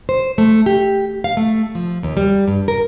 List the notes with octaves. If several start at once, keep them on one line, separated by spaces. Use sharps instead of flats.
C5
A3
G4
F5
A3
F3
D#2
G3
G2
A#4